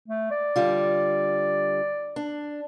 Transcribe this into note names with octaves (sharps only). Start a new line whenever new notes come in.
A3
D5
D3 G3 F4
D4